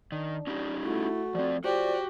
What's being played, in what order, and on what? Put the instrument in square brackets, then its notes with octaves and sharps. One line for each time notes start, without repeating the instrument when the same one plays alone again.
[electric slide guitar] D#3 [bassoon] D4
[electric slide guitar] C#4 D#4 G4
[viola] A3 [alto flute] E4 [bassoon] F#4
[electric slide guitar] F3 C4 [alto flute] D5
[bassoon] F3 [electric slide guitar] F#4 [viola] G4 [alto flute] D5